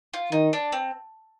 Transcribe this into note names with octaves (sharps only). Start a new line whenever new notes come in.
F4
D#3 D#4
D4
C4